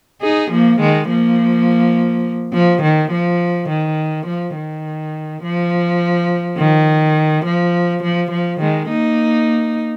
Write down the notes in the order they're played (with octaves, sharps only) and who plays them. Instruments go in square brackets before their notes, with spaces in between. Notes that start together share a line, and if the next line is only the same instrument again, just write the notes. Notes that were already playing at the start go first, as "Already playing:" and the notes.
[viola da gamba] D#4 G#4
F3 A#3
D#3 G#3
F3 A#3
F3
D#3
F3
D#3
F3
D#3
F3
D#3
F3
F3
F3
D#3 G#3
A#3 D#4